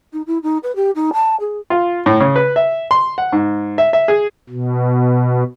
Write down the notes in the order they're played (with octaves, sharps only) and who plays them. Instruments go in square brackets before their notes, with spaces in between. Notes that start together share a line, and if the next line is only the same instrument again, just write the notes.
[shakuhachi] D#4
E4
D#4
B4
G4
D#4
A5
G#4
[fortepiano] F4
A2
C#3
B4
E5
C6
F#5
G#2
E5
E5
G#4
[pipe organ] B2